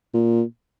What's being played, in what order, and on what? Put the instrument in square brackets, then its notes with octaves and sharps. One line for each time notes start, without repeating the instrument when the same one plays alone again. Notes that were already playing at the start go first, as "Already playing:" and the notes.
[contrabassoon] A#2